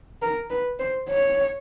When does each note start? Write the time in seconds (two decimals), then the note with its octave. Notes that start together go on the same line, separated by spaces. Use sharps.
0.22 A#4
0.50 B4
0.80 C5
1.09 C#5